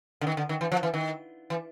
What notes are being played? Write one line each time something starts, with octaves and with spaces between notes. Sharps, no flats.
D3
D#3
D3
D#3
E3
F3
E3
D#3
E3